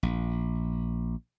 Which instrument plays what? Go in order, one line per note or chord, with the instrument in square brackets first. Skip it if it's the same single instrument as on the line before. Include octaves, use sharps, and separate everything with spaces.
[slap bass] A#1